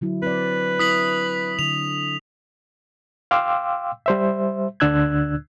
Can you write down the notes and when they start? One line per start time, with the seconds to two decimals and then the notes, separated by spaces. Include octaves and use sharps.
0.01 D3 F#3 E4
0.22 C4 B4 D5
0.79 E4 D#6 B6 F#7
1.59 D3 F7
3.31 F5 G5 C6 D6 E6
4.06 G3 C5 E5
4.80 D2 D3 D4 E6 F#6 G#6